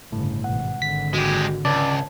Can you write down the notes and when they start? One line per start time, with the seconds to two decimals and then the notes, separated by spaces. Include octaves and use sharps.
0.12 G1 A2 C#3
0.44 G#1 B2 F#5
0.82 G#1 D3 B6
1.14 G#3 F#4 G4
1.65 C#2 D5 A5